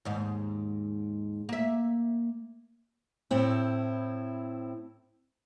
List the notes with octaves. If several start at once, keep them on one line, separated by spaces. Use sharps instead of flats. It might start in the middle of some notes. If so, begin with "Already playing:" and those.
D#2 G#2
A#3 E5
A2 C4 E4